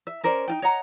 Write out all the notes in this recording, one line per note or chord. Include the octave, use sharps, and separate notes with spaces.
E5
C#4 A#4 C5 D5
D#4 F4 G5
C#5 D#5 F#5 A#5